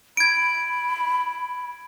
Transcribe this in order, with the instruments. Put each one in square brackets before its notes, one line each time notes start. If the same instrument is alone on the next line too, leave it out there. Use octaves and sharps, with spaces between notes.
[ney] B5 [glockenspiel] G#6 D7